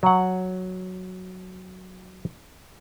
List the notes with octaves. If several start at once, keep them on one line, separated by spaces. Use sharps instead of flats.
F#3 F#5